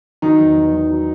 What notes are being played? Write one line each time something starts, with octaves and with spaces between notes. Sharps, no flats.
D#3 F#3 D#4
E2
E2
D#3
F#3